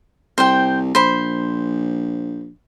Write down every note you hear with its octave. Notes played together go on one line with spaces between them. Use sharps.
C2 C5 G5
A#1 C5 B5